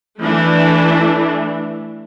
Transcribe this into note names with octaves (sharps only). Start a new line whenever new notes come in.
E3 A3 D4